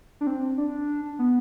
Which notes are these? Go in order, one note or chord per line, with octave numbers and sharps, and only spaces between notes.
D4
C4
D4
B3